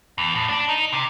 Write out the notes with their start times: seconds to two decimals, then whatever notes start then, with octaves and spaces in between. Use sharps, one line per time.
0.18 E2
0.35 A2
0.49 D4
0.69 D#4
0.93 C3